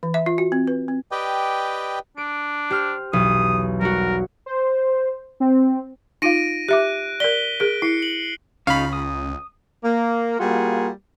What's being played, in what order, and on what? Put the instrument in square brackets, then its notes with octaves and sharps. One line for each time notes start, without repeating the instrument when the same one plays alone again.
[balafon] E3
E5
F4
F#4
C4
B4
C4
[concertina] G4 B4 D5 D#5 G5
[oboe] D4 [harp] D7
[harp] G4 C5 F6
[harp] B1 E2 [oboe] D#6
[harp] G3 F#4 [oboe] A#4
[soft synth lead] C5
C4
[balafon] D#4 F4 F5 [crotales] A#6 D7 D#7
[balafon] G4 E5 D6 [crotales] F#6
[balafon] A#4 D5 [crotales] B6 G7
[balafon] G#4 A#4 [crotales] D7
[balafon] E4 [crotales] C7 C#7
[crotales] F#7
[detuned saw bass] C#2 [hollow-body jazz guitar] C#3 [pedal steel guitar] C#4 D#4 F4 [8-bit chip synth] F5 B5
[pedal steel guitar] D#6
[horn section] A#3
G3 A#3 F4 F#4 G#4